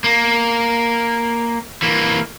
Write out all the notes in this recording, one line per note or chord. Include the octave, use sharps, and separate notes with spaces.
A#3
E3 A#3